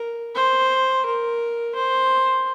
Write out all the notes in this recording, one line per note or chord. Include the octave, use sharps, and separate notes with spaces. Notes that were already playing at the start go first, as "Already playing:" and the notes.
Already playing: A#4
C5
A#4
C5